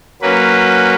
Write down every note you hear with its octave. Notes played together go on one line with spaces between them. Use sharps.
F#3 A#3 C#4 B4